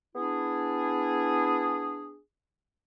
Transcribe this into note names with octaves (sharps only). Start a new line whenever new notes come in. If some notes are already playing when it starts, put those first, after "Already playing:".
B3 D4 E4 G#4